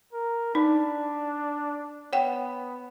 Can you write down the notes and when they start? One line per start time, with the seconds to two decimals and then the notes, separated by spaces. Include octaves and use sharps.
0.13 A#4
0.55 D4 D#4
2.13 B3 C#5 F#5 G5